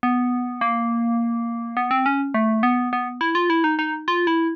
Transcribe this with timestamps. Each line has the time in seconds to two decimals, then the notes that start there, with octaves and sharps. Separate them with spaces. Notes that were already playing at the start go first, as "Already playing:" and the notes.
0.03 B3
0.61 A#3
1.77 B3
1.91 C4
2.06 C#4
2.34 A3
2.63 B3
2.93 B3
3.21 E4
3.35 F4
3.50 E4
3.64 D#4
3.79 D#4
4.08 F4
4.27 E4